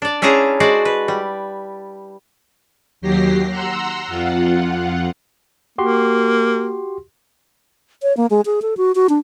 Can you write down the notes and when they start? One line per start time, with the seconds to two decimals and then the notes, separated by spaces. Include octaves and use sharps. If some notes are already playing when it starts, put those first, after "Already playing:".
0.02 D4 D5
0.22 C#4 D4 E4 G#4 F5 A#5
0.60 G#3 F#4 C5 D5
0.85 B4
1.08 G3
3.01 D#2 F#3 G4 A#6 C7
3.49 F#5 A#5 C6 E6
4.08 F2 F4 F#5
5.78 A#3 F#4 G4 C6
8.03 C#5
8.17 A#3
8.30 G#3
8.46 G#4
8.62 A4
8.77 F#4
8.95 F#4
9.09 D4